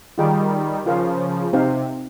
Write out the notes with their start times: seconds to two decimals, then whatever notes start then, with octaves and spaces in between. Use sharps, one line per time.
0.18 D#3 G3 F4 G#4 D#5 G5
0.85 C#3 F3 F4 A#4 F5
1.53 C3 C4 D#4 G4 C5 F5